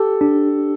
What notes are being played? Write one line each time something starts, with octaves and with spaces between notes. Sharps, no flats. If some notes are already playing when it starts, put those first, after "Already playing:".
Already playing: G4 A4
D4